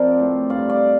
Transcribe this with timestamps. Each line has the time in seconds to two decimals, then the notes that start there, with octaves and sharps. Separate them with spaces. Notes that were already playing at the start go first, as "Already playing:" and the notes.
Already playing: F3 C4 A#4 C5 D5
0.20 A2
0.49 G2 D5 F5
0.69 D5 F5